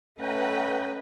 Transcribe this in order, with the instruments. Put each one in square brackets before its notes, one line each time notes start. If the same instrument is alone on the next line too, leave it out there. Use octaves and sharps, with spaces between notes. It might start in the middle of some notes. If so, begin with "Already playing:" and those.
[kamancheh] A3 [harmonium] C#4 [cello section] B4 D#5 [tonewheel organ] F#5 G5 A#5